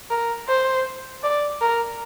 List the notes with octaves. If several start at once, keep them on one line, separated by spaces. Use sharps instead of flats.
A#4
C5
D5
A#4